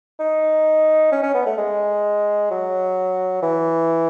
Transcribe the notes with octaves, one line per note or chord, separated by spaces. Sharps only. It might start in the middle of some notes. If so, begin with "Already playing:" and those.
D#4
C#4
C#4
B3
A3
G#3
F#3
E3